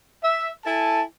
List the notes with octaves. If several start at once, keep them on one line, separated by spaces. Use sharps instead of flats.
E5
E4 A4 G#5 A5